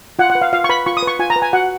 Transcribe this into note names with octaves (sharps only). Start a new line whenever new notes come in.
F4 F#5
F#5
B4
F5
F4 F5
C#6
B4 B5
F4 C#6
D#6
B4 C#6
F4 G#5
A#5
B4
G#5
F#4 F#5